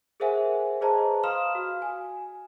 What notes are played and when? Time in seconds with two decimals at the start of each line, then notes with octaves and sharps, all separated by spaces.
0.20 G#4 A#4 C5 E5 F#5 G#5
0.81 G#4 B4 C5 D#5 A5 A#5
1.23 F5 B5 C6 D#6 F6 E7
1.55 F#4
1.82 G#5